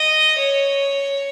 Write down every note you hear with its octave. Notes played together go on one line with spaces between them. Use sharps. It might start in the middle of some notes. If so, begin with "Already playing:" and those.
Already playing: D#5
C#5